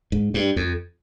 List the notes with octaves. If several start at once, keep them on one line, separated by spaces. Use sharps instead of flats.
G#2
G2
F2